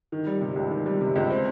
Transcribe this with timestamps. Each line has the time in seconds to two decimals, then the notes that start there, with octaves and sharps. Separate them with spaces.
0.12 D#3
0.26 G3
0.41 C3
0.56 C#2
0.71 D#3
0.86 G3
1.01 C3
1.16 C#2
1.31 C4